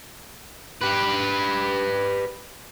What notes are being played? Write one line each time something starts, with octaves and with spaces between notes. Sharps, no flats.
G4 B4